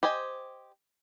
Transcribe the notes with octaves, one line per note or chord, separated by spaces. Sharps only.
G4 C5 D#5 G#5